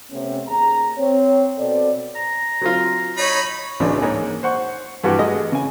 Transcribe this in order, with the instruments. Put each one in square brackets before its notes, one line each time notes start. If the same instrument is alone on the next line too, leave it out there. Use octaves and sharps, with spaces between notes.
[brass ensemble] C3 A3 B3 C#4
D#2 G#4 A#5
C4 C#5
B2 C4 A4 D5
[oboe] A#5
[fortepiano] F#3 C4 F4
[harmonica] D#4 B5 [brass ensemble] C#5
[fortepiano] G#1 C#2 A2 C#3 E3 D4
G#2 A#3 C#5 D#5
C5 F#5 C#6
G2 E3 F#4 G4 B4 F#5
G#3 A3 D#5
C#3 G#5